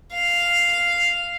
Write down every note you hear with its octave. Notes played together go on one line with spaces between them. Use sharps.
F5